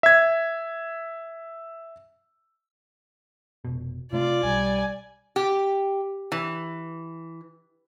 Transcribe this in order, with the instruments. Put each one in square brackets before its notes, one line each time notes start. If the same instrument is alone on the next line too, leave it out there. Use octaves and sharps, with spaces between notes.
[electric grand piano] E5 G#6
[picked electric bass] F1 B2
[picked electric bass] C3 A3 [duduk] F4 [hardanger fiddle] D5
[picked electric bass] B1 [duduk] G3 [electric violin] G#5
[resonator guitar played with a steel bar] G4
E3